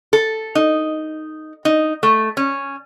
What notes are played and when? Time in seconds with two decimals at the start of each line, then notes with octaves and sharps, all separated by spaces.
0.13 A4
0.55 D#4
1.65 D#4
2.03 A3
2.37 C#4